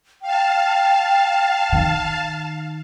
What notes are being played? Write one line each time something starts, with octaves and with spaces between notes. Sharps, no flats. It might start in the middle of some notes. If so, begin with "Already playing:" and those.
F5 G5 A5
D#3